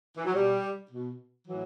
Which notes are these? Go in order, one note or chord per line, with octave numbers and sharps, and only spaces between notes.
E3
F#3
B2 G3
B2
A2 E3 F#3